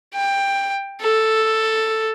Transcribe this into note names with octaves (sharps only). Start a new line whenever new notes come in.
G5
A4